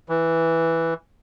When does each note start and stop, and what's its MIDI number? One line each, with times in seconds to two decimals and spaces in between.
0.09 0.94 52